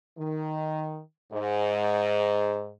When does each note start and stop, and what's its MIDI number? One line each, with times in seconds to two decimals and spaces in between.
0.17 0.99 51
1.32 2.70 44